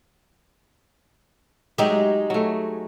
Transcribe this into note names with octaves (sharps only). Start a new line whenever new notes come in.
F#3 G#3 D#4 G4 E5
F#3 A3